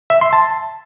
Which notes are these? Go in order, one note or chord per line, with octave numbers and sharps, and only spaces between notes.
E5
C6
A5